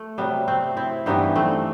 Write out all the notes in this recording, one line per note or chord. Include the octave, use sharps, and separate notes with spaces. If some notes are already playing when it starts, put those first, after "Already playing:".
Already playing: A3
C3 F#3 G3 B3
A3 C4
C4 E4
G2 E3 G3 B3 D#4
A3 C4